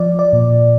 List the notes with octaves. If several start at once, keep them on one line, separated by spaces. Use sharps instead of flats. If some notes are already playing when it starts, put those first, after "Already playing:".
Already playing: F3 D5
D5
A#2